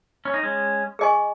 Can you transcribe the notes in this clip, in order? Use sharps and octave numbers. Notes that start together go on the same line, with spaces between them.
C#4
D#4
G#3 C#4
G#4 D#5 G#5 C#6